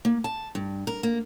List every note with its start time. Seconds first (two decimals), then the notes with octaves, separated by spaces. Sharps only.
0.05 A#3
0.24 A5
0.55 G2
0.87 A#4
1.03 A#3